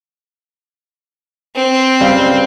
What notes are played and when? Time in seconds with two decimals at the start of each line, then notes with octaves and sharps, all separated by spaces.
1.55 C4
2.00 C#2 G3 F5